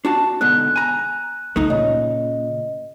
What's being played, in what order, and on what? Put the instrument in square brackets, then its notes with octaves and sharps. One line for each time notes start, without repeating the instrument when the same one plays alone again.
[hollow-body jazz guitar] D4 F#4 A5
[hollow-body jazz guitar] G#2 B2 D3 [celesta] F#6
[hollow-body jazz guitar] G#5 A#5
[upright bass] D2 [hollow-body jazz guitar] A3 D#4
[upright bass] A#2 [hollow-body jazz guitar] C#3 [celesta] D#5